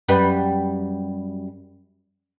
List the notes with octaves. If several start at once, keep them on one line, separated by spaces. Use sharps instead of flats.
F#2 G3 B4